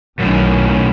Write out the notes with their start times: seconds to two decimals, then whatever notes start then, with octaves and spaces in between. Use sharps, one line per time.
0.20 B1 F#2 A2 D#3 C#4